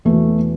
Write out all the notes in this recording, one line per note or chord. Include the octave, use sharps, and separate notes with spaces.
E2 B2 A3